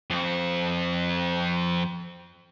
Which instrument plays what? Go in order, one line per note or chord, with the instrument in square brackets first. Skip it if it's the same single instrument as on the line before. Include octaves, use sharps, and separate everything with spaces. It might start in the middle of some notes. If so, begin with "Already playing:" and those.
[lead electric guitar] F2 C4